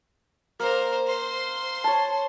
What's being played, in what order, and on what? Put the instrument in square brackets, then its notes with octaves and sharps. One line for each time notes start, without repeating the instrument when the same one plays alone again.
[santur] A#3 [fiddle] A#4 C5
[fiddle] C5 C6
[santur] C#5 A5